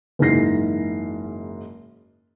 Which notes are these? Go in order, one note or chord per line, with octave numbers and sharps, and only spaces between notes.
F#1 G#2 E3 A#6 C7